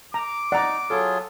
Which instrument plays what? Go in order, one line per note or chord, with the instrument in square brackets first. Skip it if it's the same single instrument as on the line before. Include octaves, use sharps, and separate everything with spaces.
[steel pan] A#5 [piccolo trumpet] D6
[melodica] D#4 [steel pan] D5 [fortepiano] F#5 A#5
[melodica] F#3 F4 G#4 [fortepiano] A4